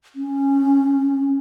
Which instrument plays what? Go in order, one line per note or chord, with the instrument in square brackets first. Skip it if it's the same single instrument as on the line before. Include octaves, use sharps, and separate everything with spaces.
[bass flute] C#4